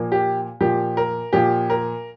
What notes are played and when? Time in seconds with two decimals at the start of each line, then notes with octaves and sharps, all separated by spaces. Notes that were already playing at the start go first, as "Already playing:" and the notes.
Already playing: A#2 F3 A#3
0.12 G4
0.61 A#2 F3 A#3 G4
0.97 A#4
1.33 A#2 F3 A#3 G4
1.70 A#4